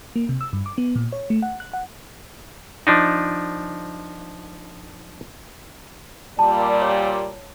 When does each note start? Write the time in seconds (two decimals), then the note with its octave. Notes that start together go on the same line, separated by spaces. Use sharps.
0.16 A#3
0.29 C3
0.41 E6
0.53 G2
0.66 D6
0.78 B3
0.96 A#2
1.12 C#5
1.30 A3
1.42 F#5
1.60 F#6
1.73 F#5
2.87 F3 D4 D#4
6.39 A#2 G3 D5 A5
6.82 C#5